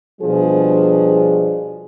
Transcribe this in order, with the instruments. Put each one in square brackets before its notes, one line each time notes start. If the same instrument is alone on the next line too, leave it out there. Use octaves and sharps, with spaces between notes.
[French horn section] B2 F3 G3 D4 G#4